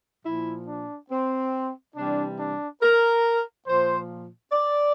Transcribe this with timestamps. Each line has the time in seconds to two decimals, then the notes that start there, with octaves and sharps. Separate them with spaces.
0.24 A#2 F3 E4
0.67 D4
1.10 C4
1.95 C3 E3 G3 D4
2.38 D4
2.81 A#4
3.67 A#2 F3 C5
4.52 D5